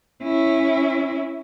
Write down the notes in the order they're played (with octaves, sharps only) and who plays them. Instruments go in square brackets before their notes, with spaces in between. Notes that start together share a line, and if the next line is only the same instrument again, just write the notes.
[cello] C#4 E4